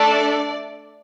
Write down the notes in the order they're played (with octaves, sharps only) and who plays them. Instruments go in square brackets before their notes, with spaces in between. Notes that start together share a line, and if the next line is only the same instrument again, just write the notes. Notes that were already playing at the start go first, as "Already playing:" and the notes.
Already playing: [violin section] A3 D4 A4 D5